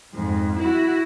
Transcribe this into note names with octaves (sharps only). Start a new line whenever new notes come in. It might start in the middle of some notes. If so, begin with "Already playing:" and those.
F2 G#2
E4 F#4